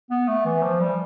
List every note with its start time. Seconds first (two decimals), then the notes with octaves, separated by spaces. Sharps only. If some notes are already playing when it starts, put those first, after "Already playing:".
0.11 B3
0.28 A3
0.46 E3
0.63 F3
0.81 G3